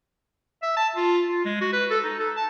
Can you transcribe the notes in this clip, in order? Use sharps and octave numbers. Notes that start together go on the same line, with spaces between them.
E5
A5
F4
F4
G#3
F#4
B4
A4
D#4
A4
A5